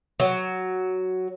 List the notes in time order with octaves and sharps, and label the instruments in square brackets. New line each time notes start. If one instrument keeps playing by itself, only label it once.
[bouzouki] F#3